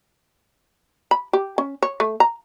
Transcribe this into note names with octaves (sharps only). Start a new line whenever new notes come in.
B5
G4
C#4
C#5
A3
A#5